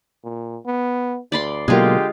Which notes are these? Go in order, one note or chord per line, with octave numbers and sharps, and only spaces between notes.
A#2
B3
D2 D5 B5 C6
B2 D3 F#3 G#3 A#3 F4 G4